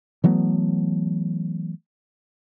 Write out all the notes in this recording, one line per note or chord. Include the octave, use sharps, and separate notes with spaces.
E3 F#3 A3 B3